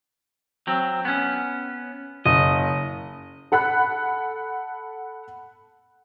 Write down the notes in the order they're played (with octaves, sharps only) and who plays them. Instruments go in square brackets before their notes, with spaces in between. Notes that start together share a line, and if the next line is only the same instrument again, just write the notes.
[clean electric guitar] F#3 C4
B3 C#4
[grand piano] F#1 [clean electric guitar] D#5
[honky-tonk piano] A4 F#5 B5 F#6